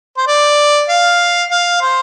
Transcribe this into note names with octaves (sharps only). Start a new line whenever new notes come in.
C5
D5
F5
F5
C5